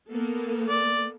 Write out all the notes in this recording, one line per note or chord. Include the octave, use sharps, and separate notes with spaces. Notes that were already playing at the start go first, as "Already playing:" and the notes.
A#3 B3 A4
D5